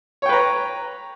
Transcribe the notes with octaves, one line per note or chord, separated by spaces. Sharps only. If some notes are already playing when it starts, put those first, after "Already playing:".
B4 C#5 G5 A#5